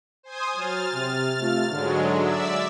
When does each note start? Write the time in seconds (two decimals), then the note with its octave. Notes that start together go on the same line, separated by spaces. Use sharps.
0.23 C5 G#5 D#6
0.55 F#3 F6 A6
0.93 C3
1.39 C3 A3 F4
1.71 G#2 D3 F#3 G#3
2.19 D5 E5 E6